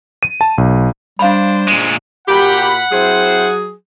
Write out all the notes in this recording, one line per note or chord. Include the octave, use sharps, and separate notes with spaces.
D#7
A5
B1
G3 D4 C5 F5 B5
A#2 G#3
A#2 F#4 G4 F#5 B5
F#3 C4 E4 G#4 C5